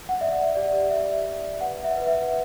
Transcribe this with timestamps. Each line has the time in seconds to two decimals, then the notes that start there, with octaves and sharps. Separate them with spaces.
0.09 F#5
0.21 D5 E5
0.55 G4 D5
0.91 G4 E5
1.26 D5
1.61 B4 F#5
1.84 E5
1.96 B4
2.07 E5